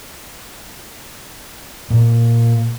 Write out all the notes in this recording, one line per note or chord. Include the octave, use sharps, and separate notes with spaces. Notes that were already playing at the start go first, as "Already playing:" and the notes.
A#2